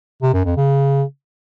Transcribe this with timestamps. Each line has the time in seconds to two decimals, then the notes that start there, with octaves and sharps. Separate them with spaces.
0.22 C3
0.34 F#2
0.45 F2
0.57 C#3